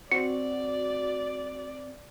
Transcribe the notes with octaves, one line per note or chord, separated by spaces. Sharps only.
C4 F#4 D5 C#7